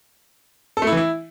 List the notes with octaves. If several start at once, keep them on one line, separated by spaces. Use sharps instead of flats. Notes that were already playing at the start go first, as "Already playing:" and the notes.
A4
A3
E4
E3
E4